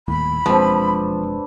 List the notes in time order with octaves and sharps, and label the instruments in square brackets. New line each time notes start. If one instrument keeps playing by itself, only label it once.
[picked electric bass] D#1 D#2 A2 [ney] B5
[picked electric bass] E1 F2 G#3 [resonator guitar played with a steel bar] F3 [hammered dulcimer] C4 D4 B4